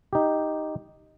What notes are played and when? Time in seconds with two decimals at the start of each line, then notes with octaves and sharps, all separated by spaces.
0.13 D#4 G4